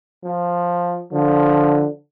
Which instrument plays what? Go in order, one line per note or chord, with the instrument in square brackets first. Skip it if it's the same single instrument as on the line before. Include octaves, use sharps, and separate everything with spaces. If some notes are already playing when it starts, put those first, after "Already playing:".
[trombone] F3
[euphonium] D3 [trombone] F3